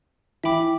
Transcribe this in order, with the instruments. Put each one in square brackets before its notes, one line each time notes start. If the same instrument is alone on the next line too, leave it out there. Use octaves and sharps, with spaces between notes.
[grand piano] E3 [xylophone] E5 G5 B5 D6